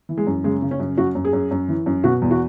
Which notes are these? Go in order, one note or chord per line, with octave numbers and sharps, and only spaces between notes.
E3
G#3
F#2
C#3 G#3
C#3
C#4
F#2
F#2 F#4
F#2
G#4
F#2
F#2
E3
F#2
B2 F#4
E2
F#4